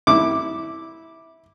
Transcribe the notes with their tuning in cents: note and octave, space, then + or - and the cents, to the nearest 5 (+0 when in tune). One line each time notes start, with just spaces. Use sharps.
E4 -15 D6 +0